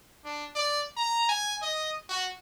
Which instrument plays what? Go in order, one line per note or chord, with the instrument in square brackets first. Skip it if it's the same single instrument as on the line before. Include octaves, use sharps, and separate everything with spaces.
[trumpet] D4
D5
A#5
G#5
D#5
F#4